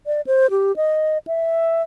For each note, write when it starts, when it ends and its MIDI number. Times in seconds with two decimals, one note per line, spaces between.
0.06 0.21 74
0.27 0.50 72
0.51 0.75 67
0.76 1.18 75
1.27 1.82 76